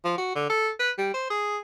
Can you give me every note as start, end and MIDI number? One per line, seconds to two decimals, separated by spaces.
0.05 0.18 53
0.18 0.34 66
0.35 0.47 50
0.50 0.70 69
0.80 0.91 71
0.98 1.12 55
1.14 1.29 72
1.30 1.59 68